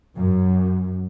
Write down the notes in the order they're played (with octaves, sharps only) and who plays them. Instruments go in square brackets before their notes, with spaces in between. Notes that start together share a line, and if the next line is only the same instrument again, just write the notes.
[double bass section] F#2